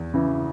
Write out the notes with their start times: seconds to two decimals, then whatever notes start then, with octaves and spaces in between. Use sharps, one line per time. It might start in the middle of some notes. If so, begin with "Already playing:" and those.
Already playing: E2
0.14 C#3 E3